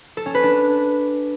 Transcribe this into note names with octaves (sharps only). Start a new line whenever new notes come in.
A4
C#4
B4
D4